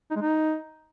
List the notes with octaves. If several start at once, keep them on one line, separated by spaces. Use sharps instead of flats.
D#4
G#3
D#4